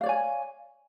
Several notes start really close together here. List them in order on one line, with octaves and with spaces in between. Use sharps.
F5 D5 C#5 G#5